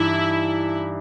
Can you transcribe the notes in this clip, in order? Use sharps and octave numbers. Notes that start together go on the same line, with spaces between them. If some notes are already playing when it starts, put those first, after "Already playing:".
Already playing: G2 E3 D#4 E4